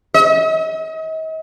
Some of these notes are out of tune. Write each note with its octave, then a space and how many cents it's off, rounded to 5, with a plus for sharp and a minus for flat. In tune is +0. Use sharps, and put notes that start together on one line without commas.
D#5 +40